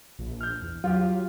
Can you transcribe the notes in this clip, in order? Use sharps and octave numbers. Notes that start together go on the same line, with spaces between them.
A#1
F6 G6
E2
F#3 F4 G4